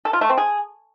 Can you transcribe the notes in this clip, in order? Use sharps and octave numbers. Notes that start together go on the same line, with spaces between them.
A4
F4
A3
C4
G#4